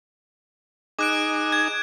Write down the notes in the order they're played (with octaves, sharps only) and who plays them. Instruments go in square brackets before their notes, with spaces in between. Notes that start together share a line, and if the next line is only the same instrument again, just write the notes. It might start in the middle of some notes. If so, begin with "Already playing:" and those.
[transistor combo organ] D#4 G#4 [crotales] D6 F#6 D7
[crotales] G#6